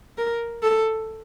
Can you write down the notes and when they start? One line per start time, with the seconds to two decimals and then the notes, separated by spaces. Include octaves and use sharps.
0.18 A#4
0.62 A4